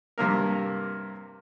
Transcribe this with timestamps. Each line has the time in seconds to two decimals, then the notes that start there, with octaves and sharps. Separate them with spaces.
0.18 G2 C3 A#3 A#4